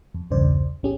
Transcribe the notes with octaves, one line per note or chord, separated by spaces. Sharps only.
F2
B1 E2 G2 C#3 C5 D5
A1 C#4 G4 G#4